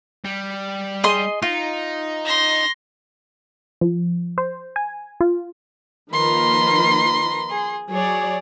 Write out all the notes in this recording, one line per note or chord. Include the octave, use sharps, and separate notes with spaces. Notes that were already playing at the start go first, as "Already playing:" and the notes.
G3
G#4 D#5 C6
D#4 F4
C6 A#6
F3
C5
G#5
F4
D#3 F3 A#3 B4 A#5 C6
G#4
F#3 G#4 C#5 D5